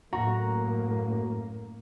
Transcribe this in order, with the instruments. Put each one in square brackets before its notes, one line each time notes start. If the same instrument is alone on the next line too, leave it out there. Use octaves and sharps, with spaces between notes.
[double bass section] F#2 A2 A#3 [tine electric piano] F#4 [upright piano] A#5